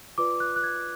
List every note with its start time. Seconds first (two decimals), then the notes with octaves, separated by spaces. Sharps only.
0.18 F4 B4 D5 D6
0.40 F#6
0.56 F#6
0.63 G#6